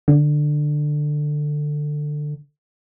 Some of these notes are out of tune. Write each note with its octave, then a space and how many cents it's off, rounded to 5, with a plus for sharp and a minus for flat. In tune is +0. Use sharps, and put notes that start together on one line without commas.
D3 +15